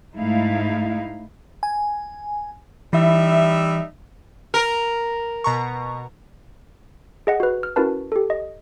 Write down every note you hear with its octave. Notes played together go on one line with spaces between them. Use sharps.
G#2 A3 D#4 E4 F5
G#5
E3 G3 D#4 E5
A#4
B2 A#5 C#6
G#4 D#5 F#5
F#4 B4
F6
C#4 E4 F#4 A#4 B4 A5
G4 A4
D#5